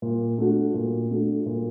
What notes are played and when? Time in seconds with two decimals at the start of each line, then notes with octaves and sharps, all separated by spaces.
0.02 A#2
0.38 A3 D4 F#4
0.74 A#2
1.11 A3 D4 F#4
1.46 A#2